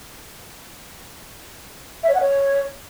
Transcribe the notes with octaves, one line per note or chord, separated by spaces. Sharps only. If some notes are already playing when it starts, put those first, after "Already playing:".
E5
C#5
F#5
C#5